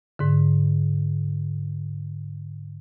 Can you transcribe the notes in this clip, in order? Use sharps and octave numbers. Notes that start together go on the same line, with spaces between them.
G#2 D3